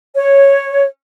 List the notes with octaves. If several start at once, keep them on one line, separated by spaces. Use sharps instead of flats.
C#5